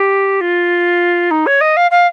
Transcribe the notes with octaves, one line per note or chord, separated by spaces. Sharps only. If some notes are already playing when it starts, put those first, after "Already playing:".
Already playing: G4
F4
D#4
C#5
D#5
F5
F5